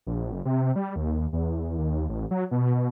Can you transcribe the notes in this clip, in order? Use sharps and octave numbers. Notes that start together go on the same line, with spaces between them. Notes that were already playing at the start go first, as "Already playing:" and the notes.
A#1
F#1
C3
G3
D#2
E2
D#2
A1
F#3
B2
B2